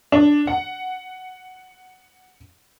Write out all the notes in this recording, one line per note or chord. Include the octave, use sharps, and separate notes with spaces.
D4
F#5